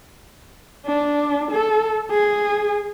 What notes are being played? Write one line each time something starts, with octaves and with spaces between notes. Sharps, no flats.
D4
A4
G#4